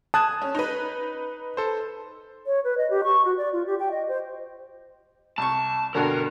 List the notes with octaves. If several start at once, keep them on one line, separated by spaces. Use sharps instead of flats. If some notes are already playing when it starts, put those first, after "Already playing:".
A5 D#6 F#6 G#6
C#4
D#4 B4
A4 C5
C#5
B4
D#5
G4
C#6
F#4
D5
F4
G4
G5
D#5
C5
C2 A5 C#6
G2 B2 D3 A#4